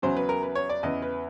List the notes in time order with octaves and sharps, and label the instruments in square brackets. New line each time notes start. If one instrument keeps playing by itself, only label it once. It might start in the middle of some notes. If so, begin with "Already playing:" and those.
[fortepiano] E2 C#3 F#3 C5
B4
A#4
B4
C#5
D5
E2 C#3 E3 D#5
B4